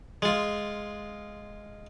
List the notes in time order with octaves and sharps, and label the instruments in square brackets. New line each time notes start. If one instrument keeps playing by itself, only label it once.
[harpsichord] G#3 F4